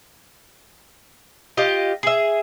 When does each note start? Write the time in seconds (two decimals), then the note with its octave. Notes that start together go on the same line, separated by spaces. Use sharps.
1.57 F4 G4 D#5
2.03 G#4 E5